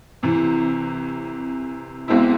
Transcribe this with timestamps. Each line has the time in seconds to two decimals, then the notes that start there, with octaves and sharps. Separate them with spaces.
0.23 C2 C3 E3
2.08 B1 B2 G#3 C4 E4